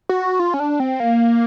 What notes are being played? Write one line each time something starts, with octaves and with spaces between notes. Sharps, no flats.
F#4
F4
C#4
D4
C4
A#3